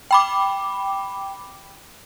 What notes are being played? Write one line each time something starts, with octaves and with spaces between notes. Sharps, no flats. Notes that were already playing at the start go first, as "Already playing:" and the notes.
G5 B5 D6